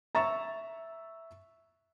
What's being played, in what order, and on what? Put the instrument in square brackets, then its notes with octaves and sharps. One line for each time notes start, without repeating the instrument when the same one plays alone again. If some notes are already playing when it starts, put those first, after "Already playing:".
[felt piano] E5 A6 E7 [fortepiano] A#5 C#6